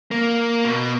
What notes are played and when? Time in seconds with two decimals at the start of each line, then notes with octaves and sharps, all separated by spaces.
0.11 A#3
0.65 B2